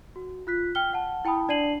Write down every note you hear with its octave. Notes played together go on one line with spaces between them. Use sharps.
F#4
F4 F#6 B6
G5 F6 G7
F#5 A5
E4 G5 A5 B5 D#6
D4 D5 A5 C7 D#7 F#7